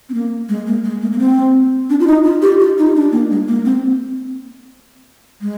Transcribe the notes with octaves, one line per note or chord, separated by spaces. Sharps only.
C4
A#3
G#3
A#3
G#3
A#3
A#3
C4
D4
F4
D#4
F4
G4
F4
D#4
D4
A#3
G#3
A#3
C4
G#3